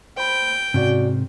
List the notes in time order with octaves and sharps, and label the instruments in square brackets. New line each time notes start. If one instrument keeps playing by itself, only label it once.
[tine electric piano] C5 B5 [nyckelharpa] G5
[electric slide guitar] G#2 C3 [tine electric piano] C#4 F#4 D5